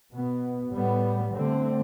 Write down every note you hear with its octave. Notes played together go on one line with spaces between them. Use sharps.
B2 B3
A2 G3 B3
D3 A3 C4